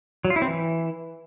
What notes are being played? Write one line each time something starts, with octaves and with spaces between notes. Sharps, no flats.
F#3
F4
E4
C4
E3